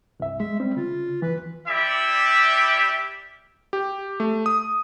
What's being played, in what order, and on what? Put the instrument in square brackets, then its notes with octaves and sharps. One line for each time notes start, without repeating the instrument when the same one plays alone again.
[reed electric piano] C2 G2 E5
[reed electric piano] G#3 [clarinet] E5
[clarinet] G3 [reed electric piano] C4
[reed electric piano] C#3 [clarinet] F4
[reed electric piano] D#2 E3 [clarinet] B4
[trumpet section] G3 E4 G4 D5 E5
[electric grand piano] G4
A3
D#6